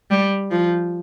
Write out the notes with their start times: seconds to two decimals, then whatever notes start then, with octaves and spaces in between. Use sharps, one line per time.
0.11 G3
0.51 F3